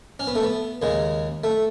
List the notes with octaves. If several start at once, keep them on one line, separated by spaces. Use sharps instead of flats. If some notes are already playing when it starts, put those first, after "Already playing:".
C#4
B3
A3
B3
D#2 C#3 G#3
A3